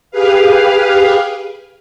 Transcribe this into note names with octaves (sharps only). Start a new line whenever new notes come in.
G4 G#4 B4 F5